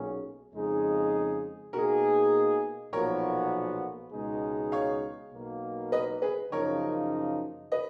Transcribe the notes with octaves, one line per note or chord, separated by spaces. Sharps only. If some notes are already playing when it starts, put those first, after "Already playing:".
Already playing: B1 A#2 F#3 C#4 G#4
F2 C#3 G#3 D#4 G#4
B2 A#3 D#4 F#4 G#4 A#4
B1 A#2 F3 B3 F#4 A#4 C#5
C#2 B2 G#3 D#4 G#4
C#5 F5
B1 B2 A#3
B4 D#5
G#4 B4
F#2 C#3 F3 A#3 D#4 A#4 C#5
B4 D#5